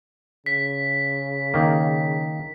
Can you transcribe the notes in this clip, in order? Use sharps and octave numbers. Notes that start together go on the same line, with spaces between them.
C#3 B6
D#3 A#3